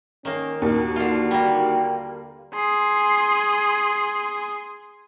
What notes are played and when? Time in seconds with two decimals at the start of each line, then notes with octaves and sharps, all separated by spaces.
0.25 D#3 A#3 C#4
0.62 D#2 F#4
0.96 D3 F4
1.31 G3 A#3 G5
2.54 G#4 C6